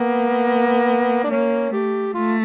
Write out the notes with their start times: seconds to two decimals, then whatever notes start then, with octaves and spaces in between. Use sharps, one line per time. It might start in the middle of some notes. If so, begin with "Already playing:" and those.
Already playing: A#3 B3
1.24 D4
1.31 A#3 C#4
1.73 A3 G4
2.14 A3 F4